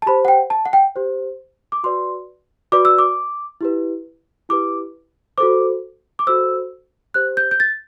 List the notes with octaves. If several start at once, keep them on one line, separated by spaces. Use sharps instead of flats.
A5
G4 C5 B5
F#5
G5
A5
F#5
G5
G4 C5
D6
F#4 B4 D5 C6
F#4 B4 D5 D6
E6
D6
E4 G4 B4
E4 G4 B4 D6
F#4 A4 C5 D6
D6
F#4 A4 C5 E6
G4 C5 F#6
G6
G6
A6